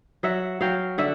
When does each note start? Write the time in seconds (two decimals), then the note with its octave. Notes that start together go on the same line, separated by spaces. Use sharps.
0.23 F#3 E5 F#5
0.61 F#3 F5 G5
0.98 D3 E5 F#5